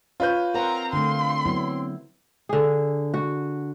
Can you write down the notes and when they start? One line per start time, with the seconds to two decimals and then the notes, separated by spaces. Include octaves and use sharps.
0.20 F4 B4 C#5 G6
0.55 C4 A#4 C5 F#5 A#5
0.93 D3 A3 C6
1.46 F#3 B3 E4
2.49 D3 G#4
3.14 F#4